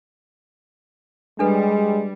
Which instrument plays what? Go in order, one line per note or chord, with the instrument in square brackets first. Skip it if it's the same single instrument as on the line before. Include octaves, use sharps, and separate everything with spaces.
[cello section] G3 [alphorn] G#3 [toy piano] D4 A4 B4